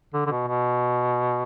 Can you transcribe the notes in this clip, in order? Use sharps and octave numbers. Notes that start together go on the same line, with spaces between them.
D3
D3
B2
B2